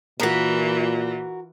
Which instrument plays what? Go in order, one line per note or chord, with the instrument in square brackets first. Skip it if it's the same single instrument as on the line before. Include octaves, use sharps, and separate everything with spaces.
[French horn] A#2 [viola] E3 F4 [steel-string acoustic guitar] F#4 A#4